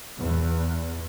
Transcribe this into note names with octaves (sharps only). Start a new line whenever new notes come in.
E2